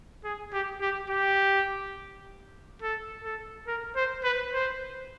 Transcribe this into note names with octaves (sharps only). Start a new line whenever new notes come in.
G#4
G4
G4
G4
A4
A4
A#4
C5
B4
C5